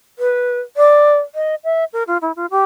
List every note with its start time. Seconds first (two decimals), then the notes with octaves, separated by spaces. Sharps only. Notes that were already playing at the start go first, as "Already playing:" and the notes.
0.19 B4
0.77 D5
1.35 D#5
1.64 E5
1.93 A#4
2.07 F4
2.22 E4
2.36 F4
2.51 G4